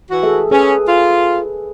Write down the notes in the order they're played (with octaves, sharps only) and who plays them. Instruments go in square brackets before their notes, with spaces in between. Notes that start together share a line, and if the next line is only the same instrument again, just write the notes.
[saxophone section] E3 F#4
[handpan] G#4 A4 E5
[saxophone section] C#4 [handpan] G#4 B4
[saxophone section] F4